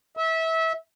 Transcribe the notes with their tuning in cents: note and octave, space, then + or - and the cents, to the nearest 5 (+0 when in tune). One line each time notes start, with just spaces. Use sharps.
E5 -25